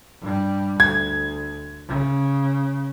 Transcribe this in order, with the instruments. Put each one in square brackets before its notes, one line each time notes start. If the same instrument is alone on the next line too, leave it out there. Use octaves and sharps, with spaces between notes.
[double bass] G2 G3
[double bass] D2 [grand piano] G#6
[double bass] C#3